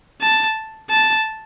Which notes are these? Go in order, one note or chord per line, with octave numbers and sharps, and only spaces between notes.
A5
A5